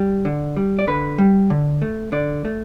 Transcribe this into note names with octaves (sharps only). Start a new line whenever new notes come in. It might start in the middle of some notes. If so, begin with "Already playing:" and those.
Already playing: G3
D3
G3
D5
D3 B4
G3
D3
A3
D3 D5
A3